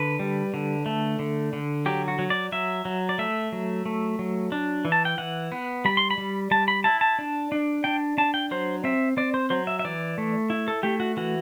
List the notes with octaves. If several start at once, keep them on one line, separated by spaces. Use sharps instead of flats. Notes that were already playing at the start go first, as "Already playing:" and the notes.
Already playing: D3 B4
G3
D3
A3
D3
D3
F#3 G4
F#4
F#3
D5
F#3 E5
F#3
D5
A3 E5
F#3
A3
F#3
D4
E3
A5
G5
E3 F#5
B3
G3 B5
C6
B5
G3
G3 A5
B5
E4 A5
A5
D4
D4
D4 G5
D4 A5
G5
F#3 C5
C4 E5
C4 D5
C5
F#3 C5
E5
E5
E3 D5
A3
E4
A4
A3 G4
F#4
E3 F#4